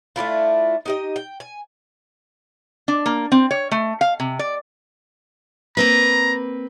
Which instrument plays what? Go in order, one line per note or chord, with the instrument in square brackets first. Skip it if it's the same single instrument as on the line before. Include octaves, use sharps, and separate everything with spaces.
[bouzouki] A3 D4 E4 F4
D#4 G4 D#5
G5
G#5
[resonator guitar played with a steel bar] D4
A#3
C4
C#5
A3
F5
C3
D5
[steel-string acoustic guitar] A#3 C4 B4 [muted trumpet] A#5